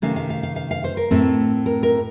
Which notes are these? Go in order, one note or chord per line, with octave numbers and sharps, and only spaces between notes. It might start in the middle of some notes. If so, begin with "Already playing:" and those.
C3 D#3 A3 C#4 F5
F5
F5
F5
F5
F5
C5
A#4
A2 A3 C4
A#4
A#4